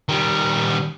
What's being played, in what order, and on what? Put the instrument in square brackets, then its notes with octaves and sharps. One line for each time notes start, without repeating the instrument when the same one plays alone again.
[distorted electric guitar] D#3 G3